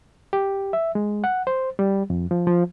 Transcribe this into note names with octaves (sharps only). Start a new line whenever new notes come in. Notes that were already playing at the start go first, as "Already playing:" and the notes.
G4
E5
G#3
F#5
C5
G3
F2
F3
F3